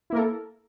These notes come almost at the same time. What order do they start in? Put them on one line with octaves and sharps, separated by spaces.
E4 A#3 A#4 A4